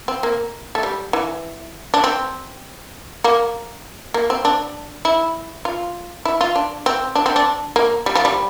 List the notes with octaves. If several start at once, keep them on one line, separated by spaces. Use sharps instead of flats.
C4
A#3
A3
G3
E3
D4
C4
A#3
A#3
C4
D4
E4
F4
E4
F4
D4
C4
D4
C4
D4
A#3
G3
F3
G3